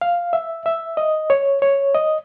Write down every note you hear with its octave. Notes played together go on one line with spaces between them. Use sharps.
F5
E5
E5
D#5
C#5
C#5
D#5